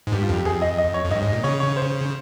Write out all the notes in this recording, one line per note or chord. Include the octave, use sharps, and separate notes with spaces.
G#2
G2 G4
F4
F2 G4
F2 G#4
D#5
D#5
C#5
F2
G2 D#5
G#2
A#2
C#3 C#5
C#5
C5